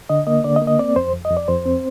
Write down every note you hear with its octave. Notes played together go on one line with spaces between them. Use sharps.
D3 D#5
A#3 D#5
D3 D5
D#5
A#3
D#5
C4 D5
F2 C5
F2
D#5
F2
D5
F2 C5
C4